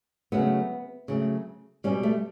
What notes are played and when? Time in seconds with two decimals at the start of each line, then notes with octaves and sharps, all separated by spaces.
0.32 C#3 F#3 A3 B3
1.08 C#3 F#3 A3
1.84 B2 G3 C#4
2.03 A3